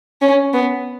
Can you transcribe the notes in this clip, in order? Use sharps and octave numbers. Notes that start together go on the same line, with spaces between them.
C#4
B3